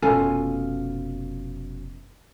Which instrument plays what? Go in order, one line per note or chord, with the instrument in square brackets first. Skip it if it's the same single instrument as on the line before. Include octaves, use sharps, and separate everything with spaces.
[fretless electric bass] F1 B2 C#4 [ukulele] F4 A4 G#5